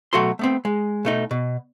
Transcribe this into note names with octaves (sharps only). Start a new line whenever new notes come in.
B2 F#3 A3 F#4 A4 C6
A3 B3 C4
G#3
B2 A3 D#4
B2